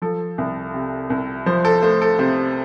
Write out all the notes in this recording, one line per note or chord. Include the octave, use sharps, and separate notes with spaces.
F3 A4
C2
C3
C2
F3 C5
A4
A3 C5
A4
C3 C5